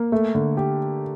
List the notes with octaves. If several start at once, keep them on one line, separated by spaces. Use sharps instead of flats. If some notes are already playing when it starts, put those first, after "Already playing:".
Already playing: A#3
A3
D3
G4